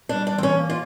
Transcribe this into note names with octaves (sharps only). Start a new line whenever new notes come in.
G3 D4
D4
E3
C4
C#4
A#3
F4